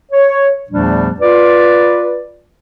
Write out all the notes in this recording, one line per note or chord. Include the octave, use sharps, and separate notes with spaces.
C#5
E2 A#2 F3 G3 A3 D4
F4 B4 D5